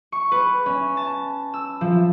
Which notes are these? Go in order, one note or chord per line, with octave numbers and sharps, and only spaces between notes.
C#6
B4
C#4
A5
E6
F3